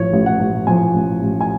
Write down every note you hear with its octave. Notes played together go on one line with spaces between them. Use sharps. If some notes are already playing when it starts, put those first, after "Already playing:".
Already playing: A1 A2 F3 C#5
A1
F#5
A1
F3 G#5
A1
A1
G#5